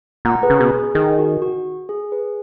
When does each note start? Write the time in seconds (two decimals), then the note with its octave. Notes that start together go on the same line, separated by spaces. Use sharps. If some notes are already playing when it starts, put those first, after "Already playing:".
0.25 A#2 F#5 A#5
0.43 G#4 B4
0.50 C#3
0.60 B2 G#4
0.78 G#4
0.95 D#3 G#4
1.19 F#4
1.42 F#4
1.89 G#4
2.12 G#4 B4